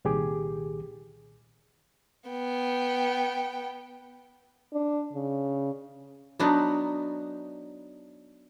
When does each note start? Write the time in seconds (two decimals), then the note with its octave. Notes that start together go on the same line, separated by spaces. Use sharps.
0.05 C2 A#2 D#3 G4 G#4 D6
2.30 B3 G5
4.73 D4
5.13 C#3
6.39 F#3 B3 D4 D#4 B4